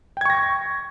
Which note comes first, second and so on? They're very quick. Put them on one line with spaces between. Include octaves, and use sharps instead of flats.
G5 G#6 C#6 A#6